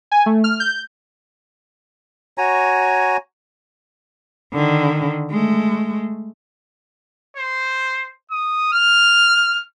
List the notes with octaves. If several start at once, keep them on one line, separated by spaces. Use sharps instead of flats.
G#5
A3
F6
G6
F#4 C#5 G#5 A#5
D3 D#3
G#3 A3
C5
D#6
F6